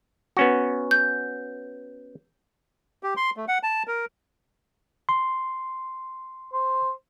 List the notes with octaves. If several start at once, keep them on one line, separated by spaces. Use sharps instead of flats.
B3 C#4 F#4
G6
G4
C6
A3
F#5
A5
A#4
C6
C5